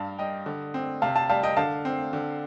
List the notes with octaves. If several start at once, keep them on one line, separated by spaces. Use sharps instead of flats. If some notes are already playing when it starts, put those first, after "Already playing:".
Already playing: G2 F5 A5
G3 D#5 G5
D3
C4
C3 F5 A5
F5 A5
G3 F5 A5
D#5 G5
D3 F5 A5
C4
D3